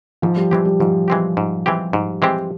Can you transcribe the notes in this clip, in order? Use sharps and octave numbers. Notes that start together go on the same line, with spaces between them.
G#2 F3
G3
E3 F3 G#3 C4 G4
G3
G#2 F3
E3 G#3 C4 G4
G#2
E3 G#3 C4 G4
G#2
E3 G#3 C4 G4